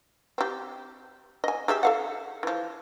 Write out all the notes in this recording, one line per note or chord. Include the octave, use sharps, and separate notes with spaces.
C4 G4
D#5 G#5
G4 G#4 E5
A4 F5 F#5
E3 F3